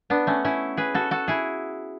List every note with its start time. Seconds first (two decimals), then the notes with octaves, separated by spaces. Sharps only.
0.10 B3 D4
0.27 A3 C#4
0.45 C#4 E4
0.77 G#4 B4
0.95 F#4 A4
1.11 F#4 A4
1.28 E4 G#4